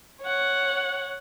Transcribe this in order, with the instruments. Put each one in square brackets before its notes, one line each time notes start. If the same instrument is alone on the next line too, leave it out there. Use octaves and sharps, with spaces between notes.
[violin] C#5 F#5